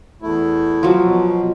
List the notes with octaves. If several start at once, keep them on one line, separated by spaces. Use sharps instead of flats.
E2 A3 E4
F3 F#3
B2